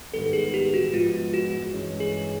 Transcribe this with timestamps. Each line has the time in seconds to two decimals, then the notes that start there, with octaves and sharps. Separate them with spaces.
0.14 G#2 D#3 G3 B3 A4
0.33 G#4
0.54 G4
0.74 F#4
0.93 G#2 F3 G#3 B3 F4
1.34 F#4
1.73 G2 E3 G#3 C#4
2.00 G#4